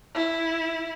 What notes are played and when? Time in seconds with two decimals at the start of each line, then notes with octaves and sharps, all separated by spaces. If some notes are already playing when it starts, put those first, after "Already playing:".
0.15 E4